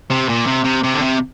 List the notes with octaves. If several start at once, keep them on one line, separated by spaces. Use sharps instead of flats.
C3
A#2
C3
C3
C3
D3
C3